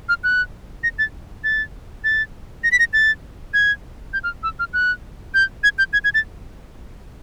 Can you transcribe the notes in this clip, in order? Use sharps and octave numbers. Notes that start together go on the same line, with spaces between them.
F6
F#6
A#6
A6
A6
A6
A#6
B6
A#6
A6
G#6
G6
F6
E6
F6
F#6
G6
G#6
G6
G#6
G#6
A6